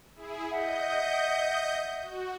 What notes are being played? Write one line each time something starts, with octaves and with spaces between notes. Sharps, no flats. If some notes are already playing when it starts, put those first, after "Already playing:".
E4 G#4
D#5 E5 F#5 G6
F#4